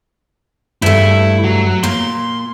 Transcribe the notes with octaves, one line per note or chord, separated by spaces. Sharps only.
G2 A3 E4
F#3
A#2 C6